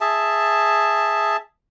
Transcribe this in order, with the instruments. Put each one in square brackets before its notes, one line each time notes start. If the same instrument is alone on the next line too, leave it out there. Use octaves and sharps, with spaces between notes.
[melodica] G#4 E5 A5